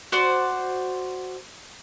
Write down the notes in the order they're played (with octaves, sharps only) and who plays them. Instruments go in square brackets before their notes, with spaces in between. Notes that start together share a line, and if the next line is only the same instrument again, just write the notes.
[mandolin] F#4 C5 D5